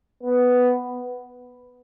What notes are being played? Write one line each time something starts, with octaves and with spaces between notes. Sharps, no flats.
B3